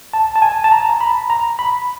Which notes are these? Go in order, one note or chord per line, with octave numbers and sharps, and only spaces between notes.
A5
A5
G#5
A5
A#5
A#5
B5
A#5
B5